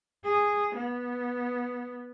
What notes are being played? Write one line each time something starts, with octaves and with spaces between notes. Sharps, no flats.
G#4
B3